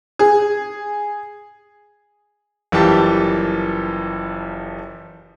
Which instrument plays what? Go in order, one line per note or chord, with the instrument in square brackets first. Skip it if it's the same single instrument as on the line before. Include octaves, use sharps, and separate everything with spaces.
[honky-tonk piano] G#4
[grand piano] F#1 E3 F3 G3 G4 A5